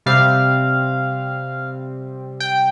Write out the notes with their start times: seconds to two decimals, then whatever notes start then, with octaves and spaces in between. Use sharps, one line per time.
0.06 C3 G3 C4 F5
2.40 G5